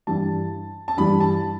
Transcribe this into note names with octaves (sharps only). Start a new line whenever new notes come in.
G2 E3 G3 A5
A5
G2 E3 G3 B5
A5